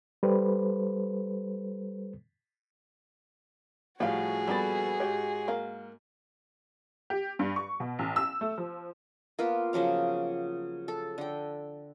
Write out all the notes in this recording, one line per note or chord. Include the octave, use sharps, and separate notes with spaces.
G3 A4 B4 C5
A2 F3 G3 F#4 G#4 F5 F#5
A#1 G3 B3 A4 B5 A6
G#2 G4 C#5
A#3 F5
G4
G2
C#6
B2
A1
E6
A3
F3
A#3 B3 F4 B4
C#3 F3 F#3 F5
A4
D3 G5